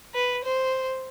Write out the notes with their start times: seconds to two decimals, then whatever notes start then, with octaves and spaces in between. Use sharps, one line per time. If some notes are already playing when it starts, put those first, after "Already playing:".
0.14 B4
0.44 C5